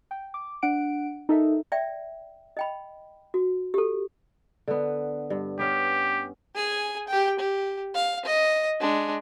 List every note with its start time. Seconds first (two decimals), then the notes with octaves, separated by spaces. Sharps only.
0.11 G5
0.34 D6
0.62 D4 F#5 D7
1.29 D#4 A4 A#4 E5
1.72 D5 E5 G5
2.57 D#5 G5 B5
3.34 F#4
3.74 G4 A4
4.68 D3 B3
5.30 G2
5.59 B3 C#4 G4 F5
6.55 G#4 G#5
7.08 G4 G5
7.39 G4
7.94 F5
8.25 D#5
8.80 G#3 D4